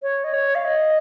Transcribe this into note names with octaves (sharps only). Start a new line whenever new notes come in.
C#5
D#5
C#5
F5
D#5